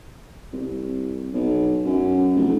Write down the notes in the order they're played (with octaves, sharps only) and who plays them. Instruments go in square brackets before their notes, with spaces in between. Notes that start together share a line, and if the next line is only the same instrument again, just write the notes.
[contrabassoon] C2
B1
F#2
F1